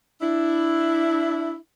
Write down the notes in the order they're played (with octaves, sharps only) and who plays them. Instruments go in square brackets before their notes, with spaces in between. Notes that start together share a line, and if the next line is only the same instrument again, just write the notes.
[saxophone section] D4 E4